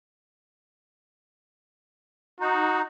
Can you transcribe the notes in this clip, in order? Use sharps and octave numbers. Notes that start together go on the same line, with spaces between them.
D#4 F#4